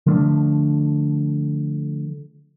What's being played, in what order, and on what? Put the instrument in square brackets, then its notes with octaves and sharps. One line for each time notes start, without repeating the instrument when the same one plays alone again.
[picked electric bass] D3 F3 A3 D4